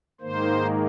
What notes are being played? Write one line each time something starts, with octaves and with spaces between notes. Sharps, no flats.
G#2 D#3 A#3 C5